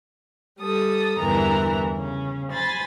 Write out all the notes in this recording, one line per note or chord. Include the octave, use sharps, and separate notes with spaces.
G3 A4 D#6
E2 G2 D3 E3 A#4 A#5
C#3 C#4
C5 G#5 B5 A6